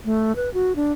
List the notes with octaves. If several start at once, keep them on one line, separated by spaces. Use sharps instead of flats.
A3
B4
F#4
D4